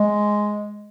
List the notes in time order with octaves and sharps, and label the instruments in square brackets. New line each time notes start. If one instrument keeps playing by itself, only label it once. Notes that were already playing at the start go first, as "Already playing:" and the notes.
Already playing: [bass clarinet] G#3